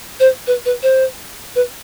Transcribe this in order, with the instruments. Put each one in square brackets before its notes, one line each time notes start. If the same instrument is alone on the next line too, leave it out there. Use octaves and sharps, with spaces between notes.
[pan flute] C5
B4
B4
C5
B4